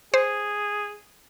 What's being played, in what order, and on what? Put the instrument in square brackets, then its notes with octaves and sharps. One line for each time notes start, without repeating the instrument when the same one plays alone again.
[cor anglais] G#4 [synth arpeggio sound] C5